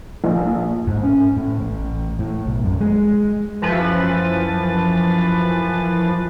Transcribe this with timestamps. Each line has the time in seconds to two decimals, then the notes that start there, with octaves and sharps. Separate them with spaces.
0.24 A#1
0.87 G#2
1.03 C#4
1.37 A2
1.61 A1
2.19 A2
2.47 B1
2.64 F#2
2.80 G#3
3.62 F#2 E3 F3 B4 A6